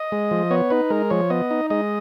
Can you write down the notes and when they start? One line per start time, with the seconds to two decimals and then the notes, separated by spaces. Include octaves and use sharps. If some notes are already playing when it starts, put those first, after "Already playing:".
Already playing: D#5
0.12 G#3
0.31 F3
0.51 B3 C#5
0.70 D#4 B4
0.90 G#3 A#4
1.10 F3 C#5
1.30 B3 D#5
1.51 D#4
1.70 G#3 D#5